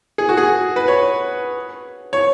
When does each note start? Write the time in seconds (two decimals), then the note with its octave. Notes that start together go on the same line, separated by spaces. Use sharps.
0.18 G#4
0.29 F#4
0.37 G#4
0.76 B4
0.88 C#5
2.13 C#5